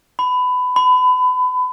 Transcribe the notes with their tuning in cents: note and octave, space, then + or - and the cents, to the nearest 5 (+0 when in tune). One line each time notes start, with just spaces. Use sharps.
B5 +20
B5 +30